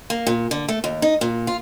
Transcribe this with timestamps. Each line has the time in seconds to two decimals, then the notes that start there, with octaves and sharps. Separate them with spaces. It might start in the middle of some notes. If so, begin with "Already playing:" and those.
0.10 A#3
0.27 A#2
0.51 D3
0.69 A3
0.84 D#2
1.02 D#4
1.21 A#2
1.47 F4